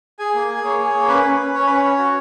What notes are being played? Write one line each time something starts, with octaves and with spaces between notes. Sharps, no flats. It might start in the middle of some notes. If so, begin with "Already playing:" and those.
G#4 G#5
A#3
G#4
A#3 C#5
G#4
A#3
C#4 B4
C#4
C#4
C#4 C#5
C#4 B4
C#5
C#4
F#4